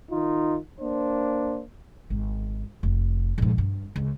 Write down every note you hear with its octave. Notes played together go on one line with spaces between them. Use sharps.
D#3 D#4 F4
A#3 D4 C5
G#1
F1
A#1 G#2
G2
C#2